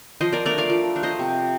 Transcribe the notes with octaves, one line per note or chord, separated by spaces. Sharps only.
F3 C5 D#5
A#4 D5
A3 D4 A#4 D5
D5 F5
F3
A3 D4
C5 D#5
C3